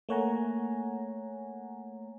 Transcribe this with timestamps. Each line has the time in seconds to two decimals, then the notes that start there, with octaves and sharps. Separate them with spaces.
0.09 A3 A#3 C#5 F#5 G#5 A#5